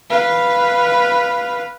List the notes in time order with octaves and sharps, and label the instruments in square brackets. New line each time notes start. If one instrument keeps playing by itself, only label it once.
[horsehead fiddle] B4 F5